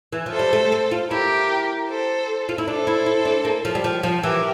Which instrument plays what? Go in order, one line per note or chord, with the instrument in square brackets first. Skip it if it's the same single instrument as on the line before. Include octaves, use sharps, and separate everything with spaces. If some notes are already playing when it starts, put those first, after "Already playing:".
[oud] E3
F3
[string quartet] A4 C5
[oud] G3
A3
C4
F4
[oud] E4 [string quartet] G4 A#4
[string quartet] A4 C5
[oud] F4
E4
[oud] D4 [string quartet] A4 C5
[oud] E4
E4
D4
A#3
F3
G3
F3
F3
[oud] E3 [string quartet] G4 A#4